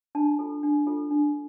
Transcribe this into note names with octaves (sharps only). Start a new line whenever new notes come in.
D4 A5
F4 A4
D4
F4 A4
D4